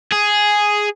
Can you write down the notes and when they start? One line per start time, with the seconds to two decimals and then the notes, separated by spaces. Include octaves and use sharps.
0.12 G#4